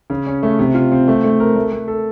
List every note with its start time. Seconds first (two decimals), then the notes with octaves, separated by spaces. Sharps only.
0.10 C#3
0.27 C#4
0.43 A3
0.59 C3
0.74 F4
0.92 C4
1.08 A3
1.24 A3
1.40 A#4
1.56 A3
1.73 A3
1.88 A4